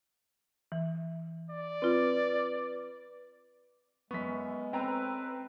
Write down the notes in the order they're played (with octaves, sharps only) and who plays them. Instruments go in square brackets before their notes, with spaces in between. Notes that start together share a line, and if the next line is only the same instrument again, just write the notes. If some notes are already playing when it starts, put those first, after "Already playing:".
[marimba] E3
[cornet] D5
[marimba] C4 F4 [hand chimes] B4
[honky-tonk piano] F#2 C#6 [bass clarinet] G#3 [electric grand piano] B3 B6
[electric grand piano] C4 [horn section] C#4 A4 B4 [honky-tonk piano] G5 A#5